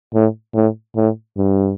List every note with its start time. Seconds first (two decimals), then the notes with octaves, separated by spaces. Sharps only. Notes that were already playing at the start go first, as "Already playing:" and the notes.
0.14 A2
0.54 A2
0.96 A2
1.37 G2